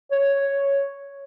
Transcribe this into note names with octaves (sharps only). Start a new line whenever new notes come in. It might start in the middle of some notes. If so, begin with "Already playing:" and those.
C#5